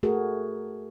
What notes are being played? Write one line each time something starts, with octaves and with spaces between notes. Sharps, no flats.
A3 F#4 G#4 A#4